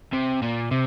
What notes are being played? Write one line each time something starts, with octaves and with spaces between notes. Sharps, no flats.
C3
A#2
C3